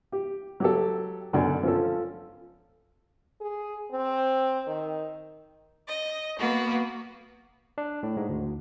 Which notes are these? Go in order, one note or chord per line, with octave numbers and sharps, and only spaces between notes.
G4
F#3 G4 A4
B1 F#2 D3 D5 G#5
F3 C#4 F4 A4
G#4
C4
D#3
D#5
A#3 B3 F#4
D4
A2
G#2
D2